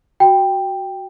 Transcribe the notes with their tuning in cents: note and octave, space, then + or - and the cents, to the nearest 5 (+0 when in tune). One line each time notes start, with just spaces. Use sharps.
F#4 +5 G5 +5